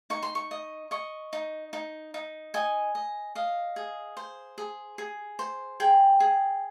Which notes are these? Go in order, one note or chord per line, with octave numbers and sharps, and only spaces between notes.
D#4 C#6
C6
C#6
D#5
D#5 C#6
D#4
D#4
D#4
D#5 G#5
D#5
D#5 F5
G#4
C5
G#4
G#4
C5
G#4 G5
G#4